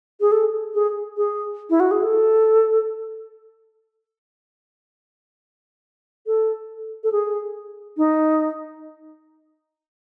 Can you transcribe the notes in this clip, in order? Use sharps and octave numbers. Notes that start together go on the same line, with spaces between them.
G#4
A4
G#4
G#4
E4
F#4
G#4
A4
A4
A4
G#4
D#4